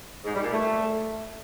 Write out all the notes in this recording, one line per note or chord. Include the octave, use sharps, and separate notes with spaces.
G#2
G3
A#2
A3